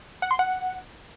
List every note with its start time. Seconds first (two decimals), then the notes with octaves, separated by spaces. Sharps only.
0.22 F#5
0.31 C6
0.39 F#5